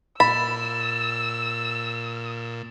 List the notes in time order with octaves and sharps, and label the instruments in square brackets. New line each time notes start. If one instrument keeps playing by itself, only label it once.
[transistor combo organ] A#2 [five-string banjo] B5 [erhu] E6 [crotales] A6 E7